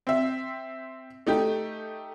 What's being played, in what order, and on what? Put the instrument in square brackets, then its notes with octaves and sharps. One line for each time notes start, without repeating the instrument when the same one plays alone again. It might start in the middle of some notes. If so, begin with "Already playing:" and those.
[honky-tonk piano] C4 E5
A3 D#4 G4